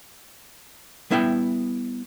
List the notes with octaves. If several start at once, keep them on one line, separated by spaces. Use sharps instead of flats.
G3 B3 E4 E5 F#5 G5